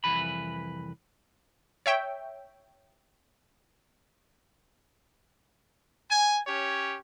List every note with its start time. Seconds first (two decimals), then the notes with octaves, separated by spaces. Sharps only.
0.04 C2 F2 E3 B4 B5
1.86 C#5 E5 G5
6.09 G#5
6.47 C#4 G4 C#5